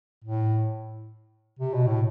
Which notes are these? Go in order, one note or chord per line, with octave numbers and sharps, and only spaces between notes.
A2
C3
B2
A2